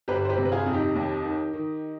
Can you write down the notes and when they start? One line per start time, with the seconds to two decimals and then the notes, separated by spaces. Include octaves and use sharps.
0.08 G1 G4 B4
0.25 C5
0.29 G4 B4
0.38 C3
0.45 B4
0.52 F4 G#4
0.66 F2
0.73 D#4 G4
0.95 D#2
1.24 D#3
1.53 D#3